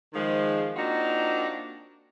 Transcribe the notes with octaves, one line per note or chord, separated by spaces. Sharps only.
D#3 F3 G#3
A#3 C4 D4 D#4 F4 F#4